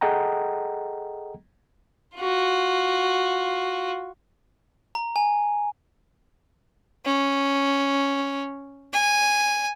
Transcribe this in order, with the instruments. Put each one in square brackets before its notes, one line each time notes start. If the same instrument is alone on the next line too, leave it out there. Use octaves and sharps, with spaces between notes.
[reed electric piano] G#4 A4 D#5 F#5 G5 A#5
[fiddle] F4 F#4
[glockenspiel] A#5
G#5
[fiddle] C#4
G#5